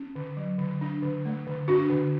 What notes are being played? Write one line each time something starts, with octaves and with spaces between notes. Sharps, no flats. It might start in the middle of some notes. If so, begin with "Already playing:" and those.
Already playing: C#4
D3
F#3
D3
D4
D3
A3
D3
D4 F#4
D3